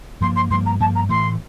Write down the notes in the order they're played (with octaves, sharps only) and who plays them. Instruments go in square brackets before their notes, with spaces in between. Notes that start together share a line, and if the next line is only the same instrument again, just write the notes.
[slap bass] G2 F3 A#3 [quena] C6
[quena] C6
[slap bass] G2 F3 A#3 [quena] C6
[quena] A#5
[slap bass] G2 F3 A#3 [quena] A5
[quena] A#5
[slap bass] A2 E3 A3 [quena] C6